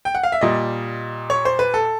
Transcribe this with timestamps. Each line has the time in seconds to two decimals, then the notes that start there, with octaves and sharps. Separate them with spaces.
0.05 G5
0.15 F#5
0.23 F5
0.32 E5
0.41 A#2 G3 D#5
1.30 C#5
1.45 C5
1.59 B4
1.74 A4